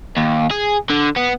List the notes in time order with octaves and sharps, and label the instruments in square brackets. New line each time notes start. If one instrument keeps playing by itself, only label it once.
[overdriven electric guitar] D#2
G#4
D3
B3